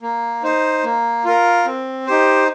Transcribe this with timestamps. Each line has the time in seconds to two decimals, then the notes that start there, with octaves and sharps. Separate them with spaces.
0.02 A#3
0.43 D#4 C5
0.84 A#3
1.25 F4 A#4
1.66 C4
2.07 D#4 G4 C5